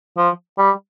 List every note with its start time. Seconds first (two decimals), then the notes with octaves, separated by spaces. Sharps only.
0.17 F3
0.58 G3